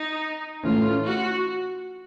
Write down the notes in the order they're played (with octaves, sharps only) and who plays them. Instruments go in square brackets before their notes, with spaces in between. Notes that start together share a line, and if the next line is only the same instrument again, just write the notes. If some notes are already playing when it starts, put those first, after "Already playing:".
Already playing: [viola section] D#4
[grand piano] A2 E3 A3 C#4 [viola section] F4
[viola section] F#4